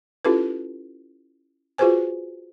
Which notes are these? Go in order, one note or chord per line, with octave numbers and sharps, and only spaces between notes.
C#4 E4 F4 G4 A4 B4
F4 F#4 G#4 B4 C5 G#5